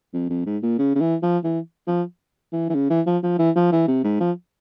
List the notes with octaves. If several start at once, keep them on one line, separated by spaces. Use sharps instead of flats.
F2
F2
G#2
A#2
C#3
C#3
E3
F3
E3
F3
E3
E3
C#3
E3
F3
F3
E3
F3
E3
C3
G#2
F3